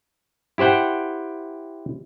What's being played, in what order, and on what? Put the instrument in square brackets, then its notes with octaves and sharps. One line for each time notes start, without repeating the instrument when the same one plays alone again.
[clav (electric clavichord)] E4 G4 C5 F#5 G5